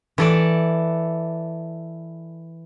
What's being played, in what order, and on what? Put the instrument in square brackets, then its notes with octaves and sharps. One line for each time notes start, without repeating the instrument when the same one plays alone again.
[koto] E3 A4 D5